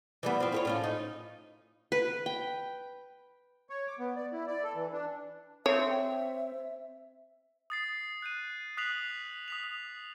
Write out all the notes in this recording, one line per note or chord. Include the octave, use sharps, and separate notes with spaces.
E3 G3 B3
F3 C4
E4 A4 C#5
A2 C#4 F4
D#4
B4
G5
C#5
D6
B3
D5
E4
D5
A4
E3
D4
C4 C#5 E5
D#6 A6 C7
F#6 G6 D#7
D#6 F#6 B6 C7 F7 F#7
B6
D#6 B6 F7
D#6